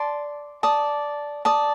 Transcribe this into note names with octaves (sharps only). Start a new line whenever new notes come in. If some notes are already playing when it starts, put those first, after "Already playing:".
Already playing: D5 A5 C6
D5 A5 D#6
D5 A5 D#6